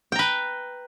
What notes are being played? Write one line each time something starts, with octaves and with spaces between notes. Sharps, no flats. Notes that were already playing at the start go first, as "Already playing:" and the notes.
B4 G5 A#5